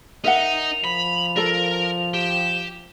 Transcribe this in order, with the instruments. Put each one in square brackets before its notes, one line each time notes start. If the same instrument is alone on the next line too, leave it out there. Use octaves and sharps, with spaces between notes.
[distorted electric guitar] D#4 [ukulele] A#4 E5 F#5 [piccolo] F7
[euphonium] F3 [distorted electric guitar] B5
[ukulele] F4 A4 D5 [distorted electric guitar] A#4
[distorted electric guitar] G4 [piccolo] E7